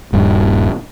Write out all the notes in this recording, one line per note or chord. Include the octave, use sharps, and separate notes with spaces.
D#1 G2